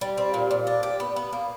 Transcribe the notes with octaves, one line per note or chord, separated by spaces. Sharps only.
G3
C4
A#2
A#2
D4
G4
B3
B3
A#3